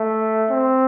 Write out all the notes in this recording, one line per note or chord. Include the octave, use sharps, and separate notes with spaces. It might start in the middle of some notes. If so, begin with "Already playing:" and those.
Already playing: A3
C4